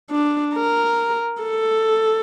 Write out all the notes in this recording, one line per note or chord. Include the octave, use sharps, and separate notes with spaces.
D4
A#4
A4